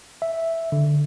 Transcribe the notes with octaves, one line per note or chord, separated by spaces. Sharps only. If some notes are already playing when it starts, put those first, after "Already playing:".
E5
D3